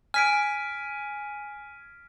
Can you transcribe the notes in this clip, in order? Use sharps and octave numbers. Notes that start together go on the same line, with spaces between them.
G#5 F6 B6 D7